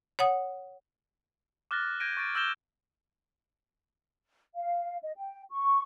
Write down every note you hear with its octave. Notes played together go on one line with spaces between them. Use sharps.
C#5 F#5 D#6
D6 F6 F#6 A6 A#6
G6 G#6 A#6 D7 D#7
C#6 A6 D7
E6 F6 G6 A#6 E7 G7
F5
D#5
G5
C#6